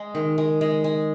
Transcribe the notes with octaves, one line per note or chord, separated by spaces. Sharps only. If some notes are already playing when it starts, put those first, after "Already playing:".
Already playing: G#3
D#3
G#3
G#3
G#3